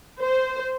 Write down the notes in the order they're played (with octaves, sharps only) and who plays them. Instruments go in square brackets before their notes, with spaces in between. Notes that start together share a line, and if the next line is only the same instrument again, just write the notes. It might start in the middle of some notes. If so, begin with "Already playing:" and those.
[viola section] C5